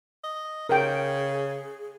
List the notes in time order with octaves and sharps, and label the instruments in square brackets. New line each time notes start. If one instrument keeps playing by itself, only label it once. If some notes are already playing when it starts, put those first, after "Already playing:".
[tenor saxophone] D#5
[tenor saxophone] C#3 [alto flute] G#4 [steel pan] A#4 G5